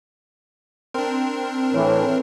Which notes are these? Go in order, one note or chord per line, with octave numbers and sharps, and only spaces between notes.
C4 D4 A#4
A2 E3 A4 C#5